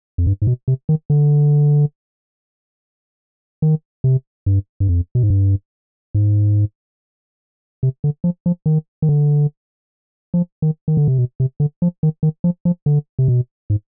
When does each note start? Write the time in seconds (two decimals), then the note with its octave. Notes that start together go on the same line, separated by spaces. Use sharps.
0.18 F2
0.27 G2
0.42 G#2
0.47 B2
0.68 C3
0.89 D#3
1.10 D3
3.62 D#3
4.04 C3
4.46 G2
4.80 G2
4.88 F2
5.15 B2
5.23 G#2
5.30 G2
6.15 G#2
7.83 C3
8.04 D3
8.24 F3
8.46 F3
8.66 D#3
9.02 D#3
9.09 D3
10.34 F3
10.62 D#3
10.88 D#3
10.97 D3
11.08 C3
11.18 B2
11.40 C3
11.60 D3
11.82 F3
12.03 D#3
12.23 D#3
12.44 F3
12.65 F3
12.86 D3
13.19 C3
13.28 B2
13.70 G#2